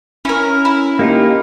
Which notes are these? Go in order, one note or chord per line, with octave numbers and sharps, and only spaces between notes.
C#4 E4 A#4
E4
A#3 D#4 F4 G4